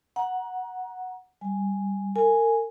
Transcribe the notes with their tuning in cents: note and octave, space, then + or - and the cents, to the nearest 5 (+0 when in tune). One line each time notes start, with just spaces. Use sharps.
F#5 +0 A#5 +25
G3 +0 G#5 +0
A#4 -35 G#5 +0